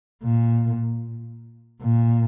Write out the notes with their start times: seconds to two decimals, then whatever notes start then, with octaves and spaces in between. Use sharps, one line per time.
0.23 A#2
1.82 A#2